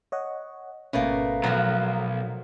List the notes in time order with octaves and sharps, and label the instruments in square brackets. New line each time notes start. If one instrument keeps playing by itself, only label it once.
[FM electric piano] C#5 D#5 F#5
[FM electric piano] G#1 C#4 [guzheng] B2 A3 A#3
[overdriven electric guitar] B1 [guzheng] F3 F#3 [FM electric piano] A#5